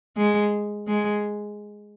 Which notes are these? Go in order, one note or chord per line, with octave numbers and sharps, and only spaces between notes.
G#3
G#3